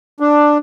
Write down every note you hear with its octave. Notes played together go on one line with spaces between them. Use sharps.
D4